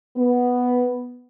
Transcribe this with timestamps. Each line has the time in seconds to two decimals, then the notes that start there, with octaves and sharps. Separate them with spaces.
0.16 B3